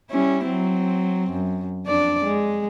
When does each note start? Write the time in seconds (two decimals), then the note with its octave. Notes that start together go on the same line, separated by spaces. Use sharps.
0.10 G3 C#4 E4
0.45 F#3 C4
1.31 F#2
1.86 F2 D4 D5
2.24 G#3